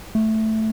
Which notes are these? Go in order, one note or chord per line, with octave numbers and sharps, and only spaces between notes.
A3